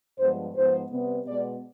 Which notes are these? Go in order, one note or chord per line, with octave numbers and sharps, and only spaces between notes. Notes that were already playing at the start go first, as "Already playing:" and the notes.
G2 F3 G#3 B3 C5
G#2 F3 B3 C5
C3 G3 B3
B2 G#3 B3 D5